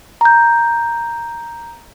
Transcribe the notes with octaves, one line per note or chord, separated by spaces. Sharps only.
A#5 G6